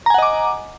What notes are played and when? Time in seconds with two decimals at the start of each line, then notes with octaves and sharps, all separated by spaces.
0.06 A#5
0.10 G#5
0.14 F#5
0.18 D#5
0.22 D6